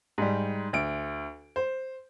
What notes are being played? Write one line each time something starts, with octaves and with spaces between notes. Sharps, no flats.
G#2 G3
D2 D7
C5